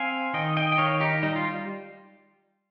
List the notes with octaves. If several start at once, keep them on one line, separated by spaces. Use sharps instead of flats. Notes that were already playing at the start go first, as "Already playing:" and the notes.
Already playing: C4 F5 G#5
D#3 D#5 G5
D#5 G5
G5
D#3 C#5 F5
D#4 G4
G3 D#4
F4